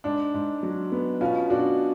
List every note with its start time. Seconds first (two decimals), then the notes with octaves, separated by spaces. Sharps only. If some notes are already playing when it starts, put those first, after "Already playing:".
0.04 G#2 D4
0.34 G#2
0.63 F#3
0.92 B3
1.21 B2 C#4 F4
1.50 B2 D4 F#4